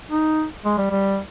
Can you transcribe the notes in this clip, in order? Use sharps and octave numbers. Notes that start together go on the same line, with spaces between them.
D#4
G#3
G3
G3